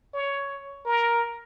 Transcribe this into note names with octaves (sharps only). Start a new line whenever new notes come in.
C#5
A#4